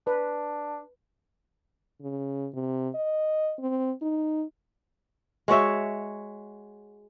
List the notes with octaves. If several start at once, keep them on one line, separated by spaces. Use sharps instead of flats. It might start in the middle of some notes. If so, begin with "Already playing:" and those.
D4 B4
C#3
C3
D#5
C4
D#4
G#3 F#4 C#5 E5